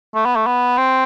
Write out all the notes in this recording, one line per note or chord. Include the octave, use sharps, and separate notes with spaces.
A3
B3
A3
B3
C4